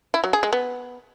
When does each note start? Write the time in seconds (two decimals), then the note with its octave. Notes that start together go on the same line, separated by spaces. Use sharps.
0.14 E4
0.24 F#3
0.33 G#4
0.43 G#3
0.53 B3